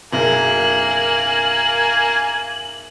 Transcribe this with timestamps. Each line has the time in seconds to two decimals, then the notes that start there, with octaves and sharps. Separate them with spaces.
0.13 F#1 B1 A#3 G#5 F#7